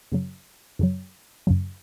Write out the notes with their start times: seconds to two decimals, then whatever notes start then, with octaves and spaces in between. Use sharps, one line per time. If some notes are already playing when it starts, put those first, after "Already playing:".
0.12 F#2 C#3 F#3
0.79 F#2 C#3 F#3
1.47 F#2 C#3 F#3